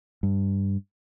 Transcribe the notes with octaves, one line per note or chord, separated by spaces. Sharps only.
G2